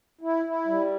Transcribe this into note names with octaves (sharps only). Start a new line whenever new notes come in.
E4
E4
G3